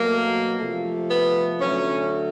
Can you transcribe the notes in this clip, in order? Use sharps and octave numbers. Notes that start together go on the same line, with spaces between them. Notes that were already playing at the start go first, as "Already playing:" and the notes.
Already playing: B2 F#3 A3 A#3
C3 F3 A3
B3
D3 F#3 A3 C#4